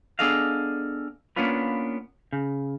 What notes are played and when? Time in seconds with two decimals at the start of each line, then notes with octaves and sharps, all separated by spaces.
0.19 B3 D4 G#4 A4 D#5 F5
1.36 A#3 B3 C#4 D4 F4 B4
2.33 C#3